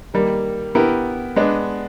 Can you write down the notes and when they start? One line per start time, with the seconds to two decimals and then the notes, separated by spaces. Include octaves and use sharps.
0.14 D#3 G3 A#3
0.75 B3 E4 G4 A#4
1.36 G#3 B3 D4